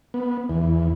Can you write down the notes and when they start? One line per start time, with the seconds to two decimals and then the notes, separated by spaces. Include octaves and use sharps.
0.14 B3
0.50 E2